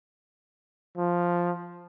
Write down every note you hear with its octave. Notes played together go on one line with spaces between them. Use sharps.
F3